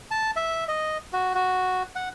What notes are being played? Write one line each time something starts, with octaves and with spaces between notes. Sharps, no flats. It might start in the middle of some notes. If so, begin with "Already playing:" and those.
A5
E5
D#5
F#4
F#4
F#5